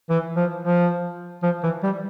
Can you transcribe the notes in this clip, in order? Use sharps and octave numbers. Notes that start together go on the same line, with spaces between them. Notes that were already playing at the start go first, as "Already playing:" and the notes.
E3
F3
F3
F3
E3
G3